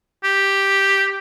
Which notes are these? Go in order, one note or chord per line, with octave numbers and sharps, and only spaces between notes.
G4